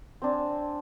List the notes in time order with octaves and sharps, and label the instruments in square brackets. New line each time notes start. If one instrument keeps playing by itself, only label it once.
[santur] C4 D4 G#5